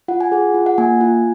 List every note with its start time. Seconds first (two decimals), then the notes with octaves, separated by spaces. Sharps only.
0.08 F4 F#5
0.21 G#5
0.32 G#4 F#5
0.54 F4
0.66 F#5
0.78 A#3 G#5
1.01 F4